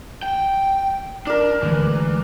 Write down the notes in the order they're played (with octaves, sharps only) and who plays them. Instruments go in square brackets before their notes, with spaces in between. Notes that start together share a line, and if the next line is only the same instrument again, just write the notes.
[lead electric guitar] G5
[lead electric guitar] D4 [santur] A#4 D5
[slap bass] D2 G#3 [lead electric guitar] E3